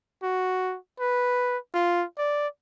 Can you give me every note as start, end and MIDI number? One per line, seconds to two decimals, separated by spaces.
0.23 0.77 66
1.00 1.57 71
1.74 2.05 65
2.18 2.47 74